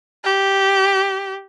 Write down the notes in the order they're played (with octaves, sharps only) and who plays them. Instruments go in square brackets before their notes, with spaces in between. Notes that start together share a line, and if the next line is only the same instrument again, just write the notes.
[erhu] G4